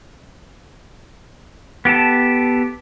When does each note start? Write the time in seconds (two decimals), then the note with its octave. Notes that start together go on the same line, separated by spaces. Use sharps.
1.85 B3 G4 A4 A5